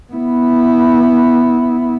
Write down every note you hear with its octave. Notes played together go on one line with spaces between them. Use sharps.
B3 E4